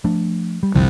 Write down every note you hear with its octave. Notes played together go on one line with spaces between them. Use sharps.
F3 A3 D4
G3
F#1 C2 D3 F3